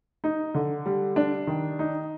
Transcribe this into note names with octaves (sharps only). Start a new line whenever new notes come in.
D#4
D3
G3
D4
D#3
D#4